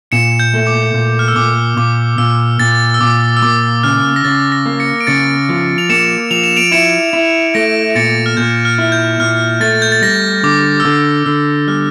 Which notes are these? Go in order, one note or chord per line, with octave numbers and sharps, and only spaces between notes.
A#2 C#7 E7
G6
A3
D6
A#2
F6
E6
A#2 D6
A#2 D6
A#2 E6
A#2 A6
E6
A#2 D6
E6
A#3 D6
C#3 F6
A#6
C#3 A6
A#6
A#3
A6 C#7
D7
C#3 A6 C#7
F3
F7
A#3 C#7 E7
F3 F7
E7
D7 F7
E4 C#7 E7
E4
A3 A#6 D7
D7
A#2 A6 C#7
F6
A#2 G6
F6
E4
G6
A#2 F6
A3 A6
G6
A6
G3 A#6
D3 D6
E6
D3 D6
D3 E6
G3 F6